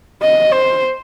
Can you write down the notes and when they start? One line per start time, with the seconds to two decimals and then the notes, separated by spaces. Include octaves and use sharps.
0.22 D#5
0.52 C5